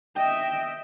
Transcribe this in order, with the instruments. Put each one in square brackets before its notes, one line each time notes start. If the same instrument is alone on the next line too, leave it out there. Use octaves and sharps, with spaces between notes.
[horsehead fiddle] D#5 E5 [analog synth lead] G5